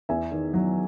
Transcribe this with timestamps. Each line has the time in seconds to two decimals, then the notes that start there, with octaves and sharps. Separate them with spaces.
0.09 E2 E5 G#5
0.32 D#3
0.54 F#3